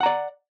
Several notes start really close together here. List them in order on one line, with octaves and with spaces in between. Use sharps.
F#5 A#5 D5